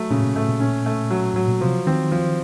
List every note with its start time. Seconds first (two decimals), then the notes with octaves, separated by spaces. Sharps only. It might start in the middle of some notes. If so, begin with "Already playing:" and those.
Already playing: F#3 A3
0.10 A#2 C#3
0.19 A2
0.23 A#2
0.36 A2 A3
0.49 A#2
0.60 C#4
0.86 A3
1.10 F#3
1.34 A2 F#3
1.48 A#2
1.61 C3 F3
1.87 D#3 C4
2.12 F3